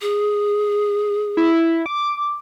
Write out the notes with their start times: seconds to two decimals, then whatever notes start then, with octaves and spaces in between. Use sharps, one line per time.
0.01 G#4
1.37 E4
1.86 D6